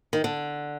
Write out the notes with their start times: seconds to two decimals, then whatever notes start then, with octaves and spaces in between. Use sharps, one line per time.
0.13 D#3
0.24 D3